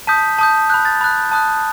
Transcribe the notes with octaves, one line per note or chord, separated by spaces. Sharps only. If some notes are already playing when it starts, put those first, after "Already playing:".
A5 D#6 G6 B6
A5 D#6 G6
B5 F#6 G6
A6
B5 F#6 A6
A5 D#6 F#6